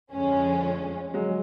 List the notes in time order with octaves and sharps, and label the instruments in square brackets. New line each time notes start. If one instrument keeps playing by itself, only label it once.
[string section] F2 D3 F3 G#3 C#4
[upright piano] F#3 G#3